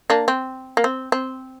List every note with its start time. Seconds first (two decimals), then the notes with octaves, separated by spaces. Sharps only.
0.10 A#3 D4
0.28 C4
0.77 A#3
0.84 C4
1.12 C4